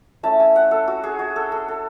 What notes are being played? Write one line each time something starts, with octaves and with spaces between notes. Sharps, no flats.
A3 C#4 E4 A5
G#5
F#5
A4
F#4
G#4
F#4
A4
A4
A4